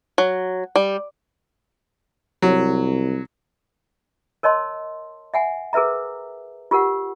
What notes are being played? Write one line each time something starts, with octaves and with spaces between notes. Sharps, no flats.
F#3
G3
C2 F#3
A#4 C#5 D#5 A5 C6
E5 F#5 G#5
G#4 A#4 B4 E5 A#5
F4 G4 A#4 F#5